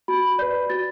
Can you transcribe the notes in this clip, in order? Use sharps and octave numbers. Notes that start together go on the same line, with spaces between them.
F#4 B5
B4 D5 G6
F#4 A6